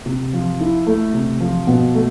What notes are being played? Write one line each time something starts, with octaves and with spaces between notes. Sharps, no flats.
C3
F3
E4
A3
C3
F3
B2
A3